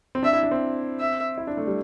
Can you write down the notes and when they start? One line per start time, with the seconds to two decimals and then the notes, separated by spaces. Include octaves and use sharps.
0.15 C4
0.23 D4 E5
0.33 E4
0.43 D4
0.51 C4
1.00 E5
1.38 E4
1.47 D4
1.57 A3
1.67 G3